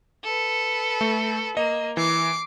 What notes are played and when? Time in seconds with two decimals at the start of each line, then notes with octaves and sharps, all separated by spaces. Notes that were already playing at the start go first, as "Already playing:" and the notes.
0.24 A4 B4
1.01 A3
1.57 A#3 D#5
1.97 E3 D6 C7